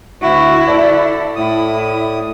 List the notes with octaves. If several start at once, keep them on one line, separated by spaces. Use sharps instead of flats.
D2 E4 F#4
A4 D5
A2 E4 D#6